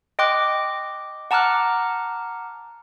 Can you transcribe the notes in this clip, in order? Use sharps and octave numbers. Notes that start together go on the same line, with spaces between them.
D#5 G5 C6 D6 F#6
F#5 A5 A#5 D6 F6 F#6